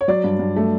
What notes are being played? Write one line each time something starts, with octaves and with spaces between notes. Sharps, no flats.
C#5
F#3 D5
G2
G2
A3